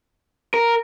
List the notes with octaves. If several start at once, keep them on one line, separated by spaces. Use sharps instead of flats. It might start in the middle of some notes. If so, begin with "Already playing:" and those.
A#4